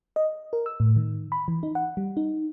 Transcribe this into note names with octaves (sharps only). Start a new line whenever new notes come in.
D#5
A#4
E6
A2
D#3
B5
E3
D#4
F#5
G3
D#4